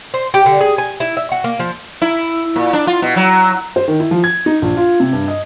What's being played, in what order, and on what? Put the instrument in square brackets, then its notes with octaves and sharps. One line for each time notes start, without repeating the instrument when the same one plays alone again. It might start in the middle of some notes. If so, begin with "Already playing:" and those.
[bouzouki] C5
G4
D3
G#4
G#5
E4
E5
F#4
A#3
F3
[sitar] E4
A#2
D4
F4
B2
F#3
[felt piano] C5
D#3
E4
F3
G#6
D#4
A#1
F4
C3
G2
D#5